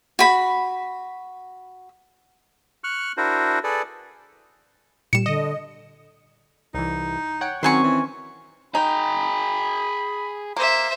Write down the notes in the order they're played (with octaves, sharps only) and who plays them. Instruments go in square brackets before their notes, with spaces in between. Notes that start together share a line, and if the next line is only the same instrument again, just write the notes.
[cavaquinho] F#4 B5
[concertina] C#6 F6 F#6
D4 E4 F#4 A#4 C5
G#4 A4 B4 D5
[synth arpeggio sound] A#2 G3 [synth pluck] C#7 E7
[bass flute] D3 [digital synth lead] D#5
[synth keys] C2 E3 [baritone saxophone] D#4
[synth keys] C#5 F#5 G5
[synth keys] D#3 C#4 [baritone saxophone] F#3 [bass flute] C4 [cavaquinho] C5 G#5 C#6
[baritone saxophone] E3
[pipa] D#4 [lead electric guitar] G#4 G5 [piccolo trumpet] B5
[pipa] A#3 [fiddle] C5 E5